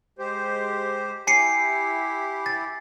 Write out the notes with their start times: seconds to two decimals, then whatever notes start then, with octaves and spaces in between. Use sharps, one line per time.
0.19 G#3 G4 C5
1.27 E4 G4 G#5 C7 C#7
2.46 A6